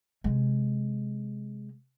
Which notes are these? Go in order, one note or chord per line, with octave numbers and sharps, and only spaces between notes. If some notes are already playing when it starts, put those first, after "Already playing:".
C3 G#3